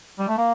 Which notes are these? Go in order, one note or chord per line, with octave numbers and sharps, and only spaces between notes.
G3
A3
A#3